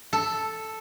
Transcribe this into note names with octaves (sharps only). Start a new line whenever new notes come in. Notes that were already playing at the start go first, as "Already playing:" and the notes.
A4